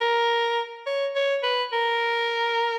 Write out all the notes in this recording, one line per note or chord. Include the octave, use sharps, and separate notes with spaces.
A#4
C#5
C#5
B4
A#4